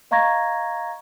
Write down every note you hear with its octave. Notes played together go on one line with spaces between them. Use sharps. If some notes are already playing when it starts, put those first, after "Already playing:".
D#5 F5 A#5 C#6 G#6 A#6